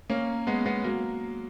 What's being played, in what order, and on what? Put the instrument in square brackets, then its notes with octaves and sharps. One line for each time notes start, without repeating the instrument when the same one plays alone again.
[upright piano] A#3 C#4
G#3 B3
G#3 B3
F#3 A#3